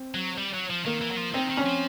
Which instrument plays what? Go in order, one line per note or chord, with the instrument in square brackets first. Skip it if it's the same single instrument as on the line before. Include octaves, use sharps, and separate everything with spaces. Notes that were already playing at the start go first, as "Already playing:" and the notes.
Already playing: [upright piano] C4
[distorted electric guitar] F#3
G3
F#3
F3
[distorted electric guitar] D#3 [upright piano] A#3
[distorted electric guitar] E3
F#3
F3
[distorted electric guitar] D#3 [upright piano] C4
[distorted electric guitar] D#3
[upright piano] C#4
[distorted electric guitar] F3